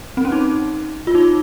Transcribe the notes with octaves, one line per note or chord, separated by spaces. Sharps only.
C4
C#4
D#4
F4
D#4